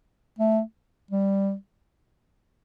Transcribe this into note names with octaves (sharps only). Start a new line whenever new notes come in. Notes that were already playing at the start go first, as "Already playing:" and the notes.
A3
G3